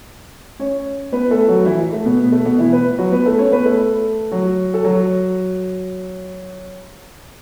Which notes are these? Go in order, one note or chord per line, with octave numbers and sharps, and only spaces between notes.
C#4 C#5
B3 B4
A3 A4
F#3 F#4
E3 E4
A3
B2 B3
B3
A3
B2 B3
E3 E4
B3 B4
F#3 F#4
B3 B4
A3 A4
C#4 C#5
B3 B4
A3 A4
F#3 F#4
A4
F#3 F#4